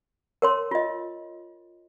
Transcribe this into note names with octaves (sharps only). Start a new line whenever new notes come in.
A#4 C#5 C6
F4 D#5